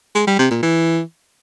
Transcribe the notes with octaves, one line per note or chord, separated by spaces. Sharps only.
G#3
G3
C3
A#2
E3